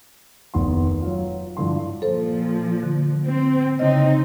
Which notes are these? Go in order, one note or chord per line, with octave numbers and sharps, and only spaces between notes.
F1 D#3 B3 C6
F#3 F4
G2 D3 F3 E4 C6
A#2 F3 A4 C5
D3
C4
C#3 C4 D#4 D#5